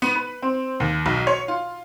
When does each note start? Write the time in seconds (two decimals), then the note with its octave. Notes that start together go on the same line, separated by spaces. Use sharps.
0.02 B3
0.15 B4
0.42 C4
0.80 D#2
1.06 B1
1.27 C#5
1.48 F4